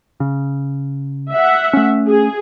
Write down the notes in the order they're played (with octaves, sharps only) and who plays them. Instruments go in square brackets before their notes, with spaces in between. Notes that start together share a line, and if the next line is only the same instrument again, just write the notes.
[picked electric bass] C#3
[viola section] E5 F#5
[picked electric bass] A3 C#4
[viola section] G#4